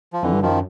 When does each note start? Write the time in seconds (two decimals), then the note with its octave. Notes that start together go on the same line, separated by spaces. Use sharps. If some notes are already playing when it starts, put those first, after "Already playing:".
0.13 F3
0.22 F2 D3 E3
0.33 G2
0.42 F#2 D#3 F3